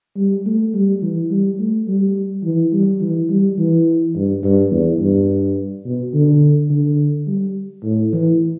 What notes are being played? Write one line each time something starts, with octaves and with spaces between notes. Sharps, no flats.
G3
A3
G3
E3
G3
A3
G3
E3
G3
E3
G3
E3
G2
G2
E2
G2
B2
D3
D3
G3
A2
E3